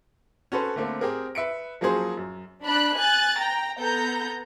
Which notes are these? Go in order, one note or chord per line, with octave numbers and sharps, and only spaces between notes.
C#4 F#4 A4 B4 C5
D3 A3 A#3 C4
C4 G4 G#4 A#4
B4 E5 C#7 D7
F3 F#3 A#3 C#4 G#4 C5
F#2
D4 B5 F#6
G#5 F#6 A6
G5 A#5
B3 A4 A#5 G6